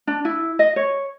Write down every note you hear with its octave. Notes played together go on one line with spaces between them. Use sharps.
D4
E4
D#5
C#5